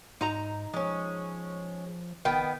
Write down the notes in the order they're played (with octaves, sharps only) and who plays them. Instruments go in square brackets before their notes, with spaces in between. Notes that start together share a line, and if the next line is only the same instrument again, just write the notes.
[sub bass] G#2 [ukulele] D#4 A#5
[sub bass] F3 [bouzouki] G#3 C#4
[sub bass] F#1 [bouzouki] D#3 B3 [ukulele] G5